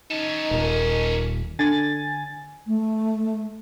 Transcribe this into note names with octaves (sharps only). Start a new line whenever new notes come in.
C#4 D#4 A4
D#1 A#4
D3 G#5 A6
A3